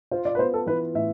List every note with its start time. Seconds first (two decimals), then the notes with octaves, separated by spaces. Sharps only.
0.11 F4 C5
0.25 D5
0.35 B4
0.39 B3 C5
0.54 A4
0.66 E3 B4
0.94 A2 E5